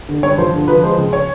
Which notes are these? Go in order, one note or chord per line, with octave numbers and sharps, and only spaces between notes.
D3
G2 C#5
F3 C5
D3
F3 B4
G#3 C5
C#2
C#5